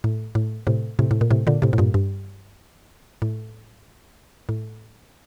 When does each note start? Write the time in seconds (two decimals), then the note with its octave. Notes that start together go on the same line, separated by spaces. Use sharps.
0.04 A2
0.35 A2
0.67 A2 C3
0.99 A2 C3
1.11 A2
1.21 A#2
1.31 A2 C3
1.47 A#2 D3
1.62 A2 C3
1.73 A2
1.78 G2 A#2
1.94 G2
3.22 A2
4.49 A2